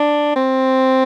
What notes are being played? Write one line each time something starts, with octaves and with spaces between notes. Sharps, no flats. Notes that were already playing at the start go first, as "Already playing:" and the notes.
Already playing: D4
C4